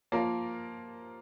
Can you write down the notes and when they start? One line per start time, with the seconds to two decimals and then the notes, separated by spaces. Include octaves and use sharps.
0.12 F3 A#3 F4 A#4